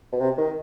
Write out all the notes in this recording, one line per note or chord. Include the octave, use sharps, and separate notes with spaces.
B2
C3
D#3